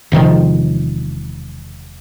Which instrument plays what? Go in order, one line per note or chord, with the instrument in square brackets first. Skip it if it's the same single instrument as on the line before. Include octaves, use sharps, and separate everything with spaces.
[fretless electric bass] E1 C3 D#3 F3